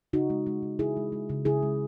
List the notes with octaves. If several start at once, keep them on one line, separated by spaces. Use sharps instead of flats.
C#3 D#4 F#4
G#3
G#3
C#3
C#3 E4 G#4
G#3
G#3
C#3
C#3 E4 G#4
G#3